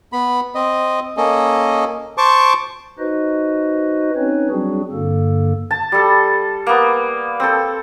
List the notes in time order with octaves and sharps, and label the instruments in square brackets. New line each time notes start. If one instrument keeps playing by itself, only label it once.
[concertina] B3 B5
C4 D#5
A#3 C#4 A4 D#5
C5 A5 C#6 D6
[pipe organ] D#4 F#4 B4 C5 D#5
C4 C#4 D#4 B4 C#5
F#3 G3 C4 D4 F#4 G#4
G2 D3 A#3 A4
[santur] A5
G3 A4
A#3 B3
C4 A4